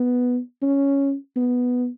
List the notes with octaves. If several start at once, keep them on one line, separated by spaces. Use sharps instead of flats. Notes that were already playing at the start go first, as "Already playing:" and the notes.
Already playing: B3
C#4
B3